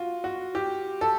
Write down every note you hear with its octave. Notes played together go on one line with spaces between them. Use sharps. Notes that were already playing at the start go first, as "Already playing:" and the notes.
Already playing: F4 F#4
F#4
G4
A4